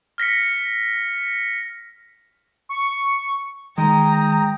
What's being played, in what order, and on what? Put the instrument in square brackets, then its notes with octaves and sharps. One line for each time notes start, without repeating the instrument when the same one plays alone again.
[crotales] F6 A#6 B6 C#7
[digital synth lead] C#6
[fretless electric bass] D#3 [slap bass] G#3 [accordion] G5 D#6 [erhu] A#5